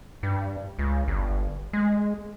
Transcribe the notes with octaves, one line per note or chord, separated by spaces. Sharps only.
G2
C#2
G1
G#3